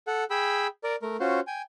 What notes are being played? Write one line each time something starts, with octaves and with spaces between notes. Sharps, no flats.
A4 F#5
G#4 G5 B5 E6
A#4 D5
A3 A#4
C#4 F4 F#4 C5
G5 G#5